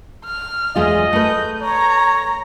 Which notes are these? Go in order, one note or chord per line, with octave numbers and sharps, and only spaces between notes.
F6
E2 G#3 F4 D#5
A3 B4 G6
C#5 A#5